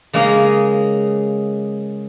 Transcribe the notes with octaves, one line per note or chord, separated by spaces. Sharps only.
C#3 G#3 A#3 G#4 D#5